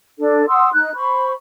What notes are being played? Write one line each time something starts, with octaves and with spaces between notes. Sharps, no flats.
D4 A4
F#5 C6 D#6 E6
D#4 F#6
C5 B5 C#6